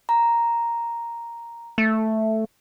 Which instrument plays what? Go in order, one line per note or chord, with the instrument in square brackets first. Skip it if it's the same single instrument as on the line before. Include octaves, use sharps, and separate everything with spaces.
[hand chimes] A#5
[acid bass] A3